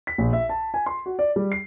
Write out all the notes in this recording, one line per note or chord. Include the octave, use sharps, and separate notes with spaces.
B6
A#1
E5
A5
G#5
C6
F#4
D5
G3
C7